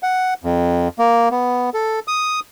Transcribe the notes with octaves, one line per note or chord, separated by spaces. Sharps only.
F#5
F2
A#3
B3
A4
D#6